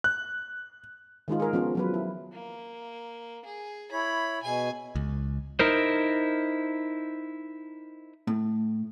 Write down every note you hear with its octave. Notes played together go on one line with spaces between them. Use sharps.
F#6
D#3 G#3 D#4 F4
G#4 A#4
F3 B3 C#4 F4
F3 F#3 B4
E4
A#3
G#4
E4 C#5 B5
B2 G#4 G#5
C#2
D#4 E4 A#4 C5
A2